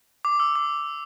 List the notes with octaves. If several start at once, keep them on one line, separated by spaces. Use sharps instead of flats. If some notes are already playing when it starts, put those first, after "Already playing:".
D6
E6
D6